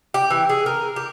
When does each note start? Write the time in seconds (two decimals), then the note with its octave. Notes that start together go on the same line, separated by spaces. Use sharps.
0.14 G4
0.30 E3
0.49 G#4
0.66 A#4
0.96 G4